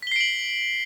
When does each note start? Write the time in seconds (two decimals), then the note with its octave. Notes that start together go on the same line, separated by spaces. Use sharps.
0.02 B6
0.07 G7
0.12 C7
0.16 D7
0.21 F#7